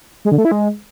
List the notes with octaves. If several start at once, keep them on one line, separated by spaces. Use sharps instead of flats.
G#3
D3
A3
E4
G#3